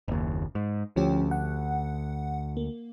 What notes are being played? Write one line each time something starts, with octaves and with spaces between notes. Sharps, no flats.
F#1 D#2
G#2
D2 F3 C#4 G4
F#5
A#3